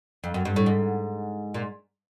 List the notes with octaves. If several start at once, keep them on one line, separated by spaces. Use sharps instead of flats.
F2
F#2
G2
A2
G#2
A#2